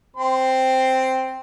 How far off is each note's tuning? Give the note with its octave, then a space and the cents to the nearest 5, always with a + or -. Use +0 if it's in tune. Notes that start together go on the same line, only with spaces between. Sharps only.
C4 +0 C6 +0